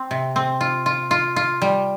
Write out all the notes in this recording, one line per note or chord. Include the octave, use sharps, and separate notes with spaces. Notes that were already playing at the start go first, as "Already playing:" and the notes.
Already playing: C4
C3
C4
F4
F4
F4
F4
G3